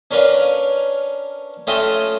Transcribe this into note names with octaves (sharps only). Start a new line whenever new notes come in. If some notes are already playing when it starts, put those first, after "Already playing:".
C#4 D4 A#4 B4 C#5 F5
A3 C#4 F4 D#5 E5 G5